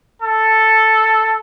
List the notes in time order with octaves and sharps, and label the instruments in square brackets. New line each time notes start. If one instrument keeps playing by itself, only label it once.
[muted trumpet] A4